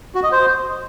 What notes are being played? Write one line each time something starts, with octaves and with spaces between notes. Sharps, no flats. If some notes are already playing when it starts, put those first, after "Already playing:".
F#4
D#5
C5